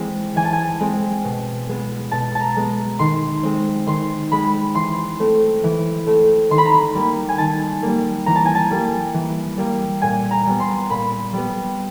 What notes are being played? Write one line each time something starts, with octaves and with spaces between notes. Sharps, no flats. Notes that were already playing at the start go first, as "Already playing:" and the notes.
Already playing: E3 G#3 C4
E3 G#5
A5
G#5
G#3 C4
B2
G#3 B3
B2 A5
A5
A#5
G#3 B3
D#3 C6
G#3 C4
D#3 C6
G#3 C4 B5
E3 C6
A3 C4
E3
A3 C4
D#3 C6
B5
A#5
B5
G3 A#3
G#5
D#3 A5
G3 A#3
E3 A#5
A5
G#5
A5
G3 A#3
E3
G3 A#3
A#2 G#5
A#5
G3 B3
C6
A#2 B5
G3 B3